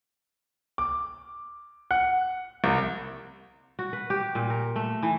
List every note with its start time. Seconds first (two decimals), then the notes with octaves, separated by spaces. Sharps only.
0.78 D6
1.91 F#5
2.64 C2
3.79 F#4
3.93 B4
4.10 G4
4.35 A#2
4.50 A#4
4.76 A3
5.02 E3